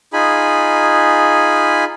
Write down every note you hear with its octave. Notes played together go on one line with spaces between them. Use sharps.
D#4 F4 G#4 G#5 B5